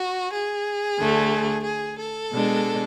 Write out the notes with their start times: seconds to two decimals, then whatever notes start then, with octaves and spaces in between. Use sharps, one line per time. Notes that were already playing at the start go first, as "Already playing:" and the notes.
Already playing: F#4
0.33 G#4
0.99 D2 D3 A3
1.64 G#4
1.98 A4
2.31 B2 G#3 D4